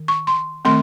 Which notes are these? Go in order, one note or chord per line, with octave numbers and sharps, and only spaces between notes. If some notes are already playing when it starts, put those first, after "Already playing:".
Already playing: D#3
C#6
C6
D#3 A3 C4 C6